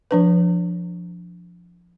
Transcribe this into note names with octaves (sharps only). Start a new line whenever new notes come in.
F3 D4 B4